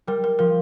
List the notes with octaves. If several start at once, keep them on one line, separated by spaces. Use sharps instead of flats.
G3 A#4
A#4
F3 A#4